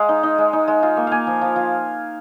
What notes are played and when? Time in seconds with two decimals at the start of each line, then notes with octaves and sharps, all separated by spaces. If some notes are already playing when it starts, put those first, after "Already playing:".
Already playing: G#3 F5
0.09 D#4
0.23 D#4
0.38 G#3
0.53 D#4
0.67 G#3
0.83 F4
0.97 A#3
1.07 A#3 F5 G#5
1.27 F3
1.41 F3
1.56 F3